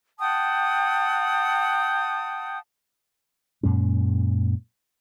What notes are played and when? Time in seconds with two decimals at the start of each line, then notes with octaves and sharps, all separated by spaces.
0.20 F#5 G5 A5 D#6
3.63 F#2 A#2 G#3 C#4